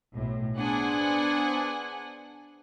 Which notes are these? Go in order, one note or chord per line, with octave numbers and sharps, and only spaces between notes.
B1 A2
B3 D4 G#4 C5 F#5 G#5